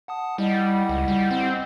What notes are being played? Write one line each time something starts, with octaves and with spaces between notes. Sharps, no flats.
F#5 A5 D#6
G3 E4 D#5 F#5
C#2
G3
C4